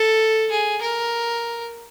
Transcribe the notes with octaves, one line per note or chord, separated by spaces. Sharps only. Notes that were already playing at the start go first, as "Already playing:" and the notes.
Already playing: A4
G#4
A#4